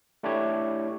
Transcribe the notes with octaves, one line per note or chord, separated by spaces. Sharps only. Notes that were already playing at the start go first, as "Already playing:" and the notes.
A3 D4 E4 G4 C#5